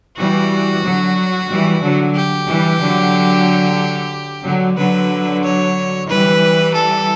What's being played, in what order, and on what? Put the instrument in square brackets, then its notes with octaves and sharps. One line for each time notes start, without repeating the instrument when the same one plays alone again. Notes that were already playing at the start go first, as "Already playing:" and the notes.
[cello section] E3 G3 [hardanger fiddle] F#4
[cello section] D3 F#3
E3 G3
D3 F#3
[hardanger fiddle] G4
[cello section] E3 G3
D3 F#3
D3 F#3
[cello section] D3 F#3 [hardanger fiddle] B4
[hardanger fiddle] C#5
[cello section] E3 G3 [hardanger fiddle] B4
[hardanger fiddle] A4